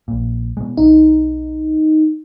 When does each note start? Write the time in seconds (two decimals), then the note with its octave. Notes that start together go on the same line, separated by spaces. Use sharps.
0.08 A#1 A#2
0.57 B2 G#3
0.77 B1 D#4